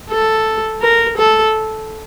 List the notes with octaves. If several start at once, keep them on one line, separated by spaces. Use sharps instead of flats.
A4
A#4
A4